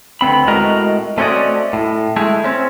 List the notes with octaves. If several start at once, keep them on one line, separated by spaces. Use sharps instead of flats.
D2 B3 C4 B5
A2 G#3 F#4 A#4 D#5 A#5
A3 C4 C#4 F#4 D5 D#5
A2
G#3 A3 E4
C4 C#4